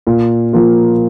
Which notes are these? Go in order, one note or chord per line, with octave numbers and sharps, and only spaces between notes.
A#2
F3 A#3 F4